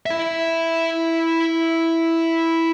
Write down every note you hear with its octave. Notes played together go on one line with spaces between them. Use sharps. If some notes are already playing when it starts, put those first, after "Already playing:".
E4 E5